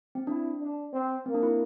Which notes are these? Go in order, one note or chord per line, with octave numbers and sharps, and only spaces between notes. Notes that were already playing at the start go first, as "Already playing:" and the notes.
C4
D4 E4
D4
C4
A#3 C4
D4
E4